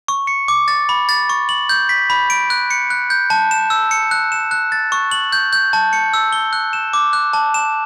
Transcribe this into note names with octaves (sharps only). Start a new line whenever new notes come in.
C#6
C#7
D6
A6
B5
A6
C#6
F#7
G6
B6
B5
D7
F#6
C#7
F#6
G6
A5
E7
E6
C#7
F#6
E7
F#6
A6
C#6
F#7
G6
G6
A5
C#7
E6
G7
F#6
E7
D6
F#6
A5
E7